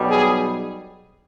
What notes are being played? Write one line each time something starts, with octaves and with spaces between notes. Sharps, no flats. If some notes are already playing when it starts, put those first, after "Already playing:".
Already playing: B1 B2 G3
G#4